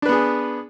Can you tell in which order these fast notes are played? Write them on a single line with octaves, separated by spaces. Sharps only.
D4 B4 B3 G#4